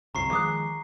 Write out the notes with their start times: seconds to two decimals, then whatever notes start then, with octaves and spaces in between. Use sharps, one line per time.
0.15 G1 C2 F2 A#5 C#6 C7
0.31 D#3 F3 G#3 D6 D#6 F#6